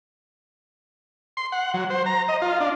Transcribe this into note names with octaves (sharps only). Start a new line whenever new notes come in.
C6
F#5
F#3
C5
A#5
D#5
F4
D4